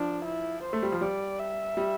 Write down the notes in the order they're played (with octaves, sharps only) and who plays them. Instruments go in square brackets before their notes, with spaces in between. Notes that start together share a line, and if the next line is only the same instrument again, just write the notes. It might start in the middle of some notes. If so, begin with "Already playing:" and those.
Already playing: [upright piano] F3 [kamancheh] D4
[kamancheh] E4
C5
[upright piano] A3
G3
F3
[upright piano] G3 [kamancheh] D5
[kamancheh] E5
[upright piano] G3